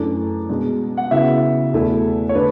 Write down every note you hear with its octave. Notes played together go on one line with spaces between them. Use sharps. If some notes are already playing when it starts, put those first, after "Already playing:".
Already playing: F#2 E3 A3 D4 A4
B2 G#3 D4
F#5
C#3 E3 B3 F#4 E5
E2 B2 A3 E4 A4
C#5
D3 A3 D4 B4